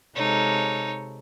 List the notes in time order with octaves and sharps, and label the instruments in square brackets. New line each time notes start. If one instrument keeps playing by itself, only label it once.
[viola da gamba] C3 G#3 A4 [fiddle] D#4 C#5